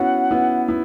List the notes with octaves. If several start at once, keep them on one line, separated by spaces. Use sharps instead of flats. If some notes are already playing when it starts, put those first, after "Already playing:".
Already playing: B3 C#4 E4 F#4 F#5
B3 E4
B3 E4